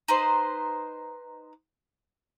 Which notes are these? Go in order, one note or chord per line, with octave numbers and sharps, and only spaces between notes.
D#4 B4 C5